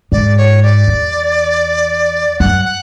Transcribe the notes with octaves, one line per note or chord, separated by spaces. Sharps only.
G#2 D5
C#5
D5
E2
F#2 F#5
F#5